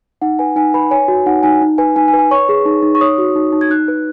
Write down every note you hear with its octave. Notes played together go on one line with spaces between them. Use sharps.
D#4 F#5
B4 G#5
D#4 G#5
B4 B5
C#5 G#5
F#4
D#4 F#5
D#4 G#5
D#4
B4 G#5
D#4 G#5
G#5
B4
G#5
C#5 C#6
G#4
D#4
D#4
C#6
C#5 D#6
F#4
D#4
D#4
G#6
D#4 F#6
B4